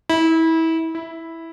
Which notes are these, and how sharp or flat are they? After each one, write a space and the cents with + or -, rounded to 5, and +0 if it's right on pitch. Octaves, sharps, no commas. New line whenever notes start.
E4 -25
E4 -5